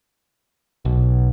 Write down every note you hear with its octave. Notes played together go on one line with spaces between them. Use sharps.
B1